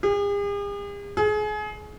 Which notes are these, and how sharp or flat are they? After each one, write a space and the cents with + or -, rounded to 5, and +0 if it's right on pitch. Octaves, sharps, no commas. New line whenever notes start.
G#4 -45
G#4 +30